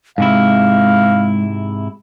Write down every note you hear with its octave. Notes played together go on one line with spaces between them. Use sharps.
G#2 C3 G#3 E4 F5